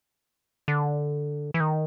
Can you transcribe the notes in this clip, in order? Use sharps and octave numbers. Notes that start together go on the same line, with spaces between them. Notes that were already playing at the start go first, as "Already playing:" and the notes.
D3
E3
D#3